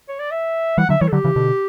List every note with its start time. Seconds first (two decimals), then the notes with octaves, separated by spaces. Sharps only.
0.08 C#5
0.19 D5
0.31 E5
0.78 E3 G3 F#5
0.89 D3 F#3 E5
1.01 E3 G3 C#5
1.08 A4
1.12 D3 F#3 G4
1.24 C#3 E3
1.36 B2 D3